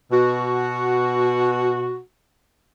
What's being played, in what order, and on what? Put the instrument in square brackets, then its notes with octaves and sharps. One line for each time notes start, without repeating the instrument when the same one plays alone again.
[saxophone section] B2 F#4